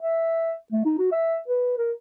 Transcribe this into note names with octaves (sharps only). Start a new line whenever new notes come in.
E5
A3
D#4
F#4
E5
B4
A#4